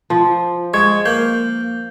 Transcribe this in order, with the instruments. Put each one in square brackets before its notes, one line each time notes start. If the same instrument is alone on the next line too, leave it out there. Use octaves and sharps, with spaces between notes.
[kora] F3
[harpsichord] G#3 [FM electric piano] C#6 G#6
[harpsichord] A#3 [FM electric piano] G6